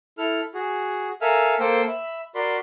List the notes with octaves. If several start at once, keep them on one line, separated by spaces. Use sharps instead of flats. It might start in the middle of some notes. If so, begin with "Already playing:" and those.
E4 A4 F6
F#4 G#4
A4 A#4 E5 F5 G#5 F6
A#3 A4 C5 G5
E5 B5
F#4 A#4 D5 B5 C6